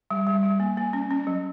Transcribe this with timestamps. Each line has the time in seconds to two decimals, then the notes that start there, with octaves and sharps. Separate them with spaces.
0.11 G3
0.27 G3
0.43 G3
0.60 A#3
0.77 A#3
0.93 C#4
1.10 C#4
1.27 F#3